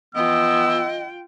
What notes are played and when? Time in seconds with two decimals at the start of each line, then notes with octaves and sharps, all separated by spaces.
0.15 E3 F3 B3 F4 D#5 G5 E6